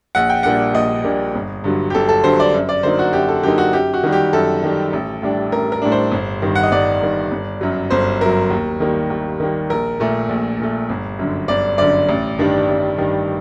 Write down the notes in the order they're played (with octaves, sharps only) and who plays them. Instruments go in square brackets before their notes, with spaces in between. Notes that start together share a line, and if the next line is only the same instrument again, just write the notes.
[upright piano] A#1 F#5
G5
A#2 G3 A#3 D4 F#5
A#1 D#5
A#2 G3 A#3 D4
G1
G2 D3 F#3
G4
G1 A4
A4
G2 D3 F#3 C5
D5
F#2
D5
D3 F#3 A#3 D#4 C5
F#4
F#2 G4
A4
D3 F#3 A#3 D#4 G4
F#4
F#2 G4
F#4
D#3 G3
G4
F#2 A4
D#3 G3
A1
A2 G3 D4
A1 A#4
A#4
A2 G3 D4
C5
G1
G2 D#3
F#5
D#5
G1 D5
G2 D#3
G1
F#2 F#3
G1 C5
F#2 F#3 A#4
D#2
D#3 G3 A#3
D#2
D#3 G3 A#3
A#1 A#4
A#2 A3
A#1
A#2 A3
G1
F#2 D3
G1 D5
F#2 D3 D5
A1
G2 D#3 G3 D4
A1
G2 D#3 G3 D4